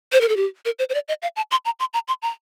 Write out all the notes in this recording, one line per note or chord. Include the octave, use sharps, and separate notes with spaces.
C5
A#4
A4
G4
A#4
C5
C5
D5
D#5
F5
A5
C6
A#5
C6
A#5
C6
A#5